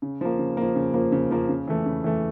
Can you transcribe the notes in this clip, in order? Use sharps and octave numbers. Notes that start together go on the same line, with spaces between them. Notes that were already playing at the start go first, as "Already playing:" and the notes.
C#3
F3 A#3
C#3
F3 A#3
C#3
F3 A#3
C#3
F3 A#3
C#3
E3 A3
C#3
E3 A3